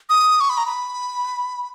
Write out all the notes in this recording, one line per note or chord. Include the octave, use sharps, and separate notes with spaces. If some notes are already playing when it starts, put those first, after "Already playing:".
D#6
C#6
B5
A#5
B5